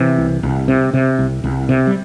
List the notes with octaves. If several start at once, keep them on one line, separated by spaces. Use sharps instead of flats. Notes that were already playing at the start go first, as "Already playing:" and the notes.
Already playing: C3 E3
C2
C2
C3
C3
C2
C2
C3
G3